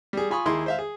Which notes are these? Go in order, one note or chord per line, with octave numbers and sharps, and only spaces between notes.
G3 G#4
F4 G#5 B5 C#6 D#6
D#2 E4 G#4 C6
C5 E5 F5
G#4